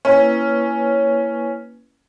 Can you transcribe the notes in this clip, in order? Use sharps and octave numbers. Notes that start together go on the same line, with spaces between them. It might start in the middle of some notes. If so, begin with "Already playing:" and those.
A#3 C#4 E4 B4